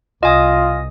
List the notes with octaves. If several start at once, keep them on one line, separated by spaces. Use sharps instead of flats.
C2 F4 D#5 G#5 D#6